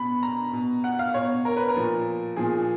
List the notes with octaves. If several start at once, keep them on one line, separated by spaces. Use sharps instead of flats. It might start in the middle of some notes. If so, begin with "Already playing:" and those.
Already playing: B2 B5
A#5
B2
F#5
F5
B2 C#5
A#4
B4
A#4
A#2 F3
A#2 F3 G#4